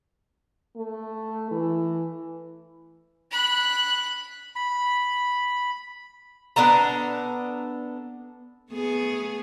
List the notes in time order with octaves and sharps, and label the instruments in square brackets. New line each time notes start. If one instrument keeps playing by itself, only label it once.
[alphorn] A3
E3
[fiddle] B5 F#6
[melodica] B5
[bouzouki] B3 D4 A4 A#5
[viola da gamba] A3 B3 G#4